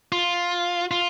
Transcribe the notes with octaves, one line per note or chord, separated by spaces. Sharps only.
F4
F4